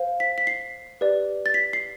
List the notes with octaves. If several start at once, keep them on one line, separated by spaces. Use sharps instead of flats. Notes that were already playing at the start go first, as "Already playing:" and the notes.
Already playing: C5 F5
B6
B6
C7
G4 B4 D5
A6
B6
C7